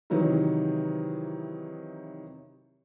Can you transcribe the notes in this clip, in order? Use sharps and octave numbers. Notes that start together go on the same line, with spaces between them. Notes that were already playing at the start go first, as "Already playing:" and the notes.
C3 D#3 E3 F#3 G3 D#4